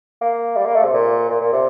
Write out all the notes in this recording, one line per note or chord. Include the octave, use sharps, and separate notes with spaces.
A#3
G3
A#3
A3
C3
A#2
A#2
A#2
C3